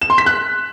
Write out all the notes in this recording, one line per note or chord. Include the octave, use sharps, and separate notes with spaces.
E7
C6
B6
F#6